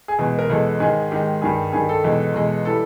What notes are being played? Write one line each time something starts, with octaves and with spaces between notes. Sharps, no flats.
G#4
E2 B2 G#3 G#4
A#4
E2 B2 G#3 A4
G#2 D#3 G#3 G#4
G#2 D#3 G#3 G4
G2 D#3 G3 G#4
G2 D#3 G3 G#4
A4
E2 B2 G#3
E2 B2 G#3
E3 G3 A4